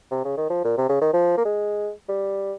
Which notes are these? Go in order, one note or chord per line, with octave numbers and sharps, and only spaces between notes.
C3
C#3
D#3
F3
A#2
C3
C#3
D#3
F3
A#3
G#3
G3